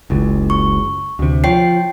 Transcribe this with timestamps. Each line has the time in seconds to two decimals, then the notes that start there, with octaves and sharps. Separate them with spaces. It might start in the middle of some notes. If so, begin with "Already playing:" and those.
0.10 F#1 C#2
0.50 C#6
1.19 D2 C3
1.44 F3 C#5 G5 C7